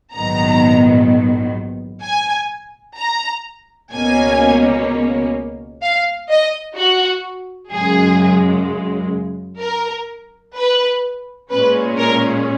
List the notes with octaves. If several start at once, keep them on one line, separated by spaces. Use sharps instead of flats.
A#1 G#2 D#3 F#3 B3 A#5
G#5
A#5
C#2 B2 A#3 C#4 G#5
F5
D#5
F#4
F#2 C#3 G#3 G#4
A#4
B4
A#2 G#3 C#4 B4
A#4